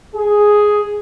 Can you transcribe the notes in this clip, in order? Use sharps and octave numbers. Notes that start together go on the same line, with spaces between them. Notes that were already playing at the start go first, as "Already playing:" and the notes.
G#4